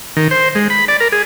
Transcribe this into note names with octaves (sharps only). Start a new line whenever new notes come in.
D#3
C5
G#3
B5
D5
A#4
G#4